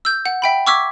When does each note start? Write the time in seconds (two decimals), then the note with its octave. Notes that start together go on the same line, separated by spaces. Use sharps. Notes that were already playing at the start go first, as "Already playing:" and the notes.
0.05 E6 G6
0.26 F#5
0.42 E5 G5 B5
0.67 C#6 D6 E6 F6 G#6 B6